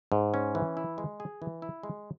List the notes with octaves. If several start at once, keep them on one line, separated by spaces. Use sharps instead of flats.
G#2
C#4
E3
E4
G#3
G#4
E3
E4
G#3